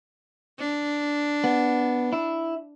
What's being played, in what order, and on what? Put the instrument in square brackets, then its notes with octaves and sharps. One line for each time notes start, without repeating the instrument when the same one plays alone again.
[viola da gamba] D4
[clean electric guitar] B3
E4